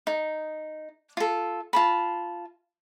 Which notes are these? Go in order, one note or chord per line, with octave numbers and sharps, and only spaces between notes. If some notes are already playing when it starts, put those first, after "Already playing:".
D#4
F4 A4
F4 A5 B5